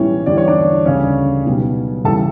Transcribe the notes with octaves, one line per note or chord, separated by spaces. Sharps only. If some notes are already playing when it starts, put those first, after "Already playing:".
Already playing: B1 A2 E3 G3 C#4 C#5
E2 D3 G3 D5
C#5
D4 D5
D2 C#3 G3 C#4 C#5
B1 B2 G3
E2 C#3 G3 A4 A5